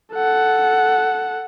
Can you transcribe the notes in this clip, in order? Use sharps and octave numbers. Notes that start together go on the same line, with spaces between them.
A4 F#5